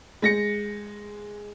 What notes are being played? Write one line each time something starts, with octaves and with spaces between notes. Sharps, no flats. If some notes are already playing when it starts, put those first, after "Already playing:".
G#3 A#6 C#7